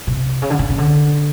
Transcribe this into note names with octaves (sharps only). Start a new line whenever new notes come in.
C3
C#3
D3
C#3
C#3
D3